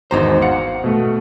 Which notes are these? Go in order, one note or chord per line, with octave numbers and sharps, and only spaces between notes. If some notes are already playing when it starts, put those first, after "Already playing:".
G#1 E2 D#4 F#4 C5 A#5
F5 F#5 C#7
B2 A3